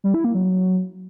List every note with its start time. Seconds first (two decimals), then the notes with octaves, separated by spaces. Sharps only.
0.04 G3
0.14 E4
0.24 A#3
0.35 F#3